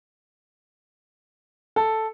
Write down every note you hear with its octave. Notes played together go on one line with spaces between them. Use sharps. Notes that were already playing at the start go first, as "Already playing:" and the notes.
A4